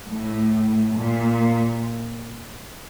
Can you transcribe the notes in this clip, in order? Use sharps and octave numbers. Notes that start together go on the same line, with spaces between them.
A2
A#2